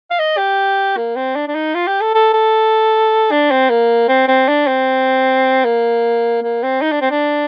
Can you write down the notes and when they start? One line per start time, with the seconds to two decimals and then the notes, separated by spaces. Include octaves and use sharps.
0.11 F5
0.19 D#5
0.38 G4
0.97 A#3
1.16 C4
1.36 D4
1.48 D4
1.55 D#4
1.75 F4
1.88 G4
2.01 A4
2.14 A4
2.34 A4
3.32 D4
3.51 C4
3.70 A#3
4.08 C4
4.28 C4
4.48 D4
4.67 C4
5.65 A#3
6.43 A#3
6.63 C4
6.82 D#4
6.92 D4
7.02 C4
7.11 D4